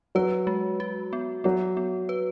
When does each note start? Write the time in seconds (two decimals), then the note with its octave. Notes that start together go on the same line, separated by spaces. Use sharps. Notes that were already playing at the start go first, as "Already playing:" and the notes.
0.15 F#3 B4
0.47 G#3
0.80 F#4
1.13 B3
1.44 F#3 B3
1.77 B3
2.09 B4